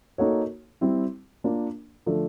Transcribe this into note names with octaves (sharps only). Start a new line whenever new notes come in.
A#3 D#4 F#4 A4 C#5
G3 C4 E4
A#3 D4 F4 A#4
D3 F3 A3 D4